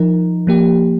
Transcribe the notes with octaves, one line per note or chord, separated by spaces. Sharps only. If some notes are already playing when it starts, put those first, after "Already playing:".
Already playing: F3 D#4 A#4
F3 A#3 G4